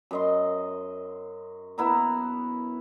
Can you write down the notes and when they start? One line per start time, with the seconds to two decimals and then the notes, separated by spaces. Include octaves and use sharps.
0.11 F#2 D#5 C6
1.78 B3 E4 A#5